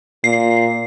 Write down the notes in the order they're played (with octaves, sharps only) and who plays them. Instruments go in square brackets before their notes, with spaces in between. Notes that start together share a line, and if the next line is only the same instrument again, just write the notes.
[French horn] A#2 [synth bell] C7